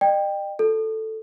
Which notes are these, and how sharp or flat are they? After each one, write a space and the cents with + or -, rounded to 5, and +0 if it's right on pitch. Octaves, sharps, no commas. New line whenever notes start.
D#5 -45 G5 +10
F4 +45 A4 +0